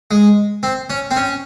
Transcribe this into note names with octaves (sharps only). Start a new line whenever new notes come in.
G#3
C4
C#4
C4
C#4